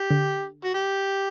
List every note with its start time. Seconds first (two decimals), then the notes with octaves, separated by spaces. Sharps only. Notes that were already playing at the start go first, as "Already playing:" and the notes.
Already playing: G4
0.11 D3
0.64 F#4
0.74 G4